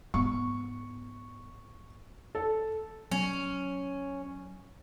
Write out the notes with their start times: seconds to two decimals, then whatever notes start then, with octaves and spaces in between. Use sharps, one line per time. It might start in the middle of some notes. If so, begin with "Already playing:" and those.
0.14 G#2 B3 C#6
2.35 A4
3.11 F#3 C#4